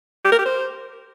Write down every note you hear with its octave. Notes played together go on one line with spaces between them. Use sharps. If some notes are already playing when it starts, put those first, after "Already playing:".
G4
A#4
G4
C5